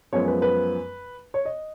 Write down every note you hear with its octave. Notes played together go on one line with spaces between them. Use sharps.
F#2 F3 G#3 B3 C#5
B4
B4
C#5
D#5